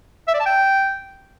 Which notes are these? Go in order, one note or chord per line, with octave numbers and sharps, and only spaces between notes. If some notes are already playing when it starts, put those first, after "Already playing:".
E5
D5
A5
G5